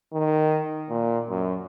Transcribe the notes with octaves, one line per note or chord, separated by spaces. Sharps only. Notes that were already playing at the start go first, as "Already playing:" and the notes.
D#3
A#2
F#2